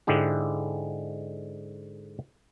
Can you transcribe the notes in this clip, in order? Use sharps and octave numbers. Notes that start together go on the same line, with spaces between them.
G#2 D3 G#3 E4 G4